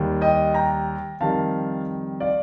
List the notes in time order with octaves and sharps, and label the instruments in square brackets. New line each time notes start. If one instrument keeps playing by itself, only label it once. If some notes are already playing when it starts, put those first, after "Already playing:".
Already playing: [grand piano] D#2 D#3 G3
D#5 G5
G5 A#5
F2 D#3 G3 F5 A5
D5 F5